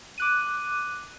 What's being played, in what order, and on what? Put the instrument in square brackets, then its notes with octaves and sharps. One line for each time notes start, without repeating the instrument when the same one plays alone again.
[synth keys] D6 F#6 D#7